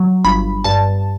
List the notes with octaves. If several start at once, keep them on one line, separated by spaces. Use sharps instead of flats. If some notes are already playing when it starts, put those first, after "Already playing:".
Already playing: F#3
G1 B5
G2 A5